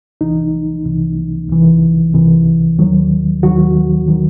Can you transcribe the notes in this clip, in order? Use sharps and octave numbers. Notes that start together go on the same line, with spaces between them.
C2 C3 E3 D#4
C2 C3 E3
C2 C3 E3
C2 C3 E3
D#2 D#3 F#3
D#2 D#3 F#3 F#4
D#3 F#3